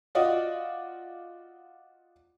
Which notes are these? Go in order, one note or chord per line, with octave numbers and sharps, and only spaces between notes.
F4 F#4 D5 D#5